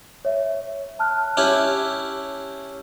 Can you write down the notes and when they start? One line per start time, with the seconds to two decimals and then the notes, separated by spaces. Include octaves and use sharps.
0.25 C#5 E5
0.99 A5 F6 F#6
1.37 C#4 E4 G4